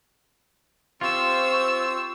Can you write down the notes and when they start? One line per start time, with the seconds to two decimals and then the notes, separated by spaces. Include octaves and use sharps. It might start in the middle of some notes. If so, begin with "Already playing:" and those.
1.01 C4 F4 G4 C5 C#6 E6